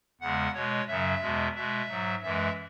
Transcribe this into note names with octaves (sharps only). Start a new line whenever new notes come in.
E2 C#3 G#3 F#5
B2 G#3 C#5
F#2 C#3 F#3 E5
E2 B2 G#3
B2 G#3 E5
G#2 F#3
F#2 E3 G#3 E5